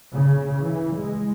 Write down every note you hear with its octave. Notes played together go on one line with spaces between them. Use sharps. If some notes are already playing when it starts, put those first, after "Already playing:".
C#3
E3
G#3